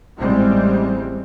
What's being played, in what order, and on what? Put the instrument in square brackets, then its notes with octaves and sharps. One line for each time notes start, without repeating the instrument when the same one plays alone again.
[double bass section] A1 A2 G3 G#3 C4